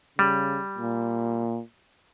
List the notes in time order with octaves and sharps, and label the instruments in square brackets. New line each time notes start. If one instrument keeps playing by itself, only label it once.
[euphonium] C#3 [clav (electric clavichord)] G3
[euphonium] A#2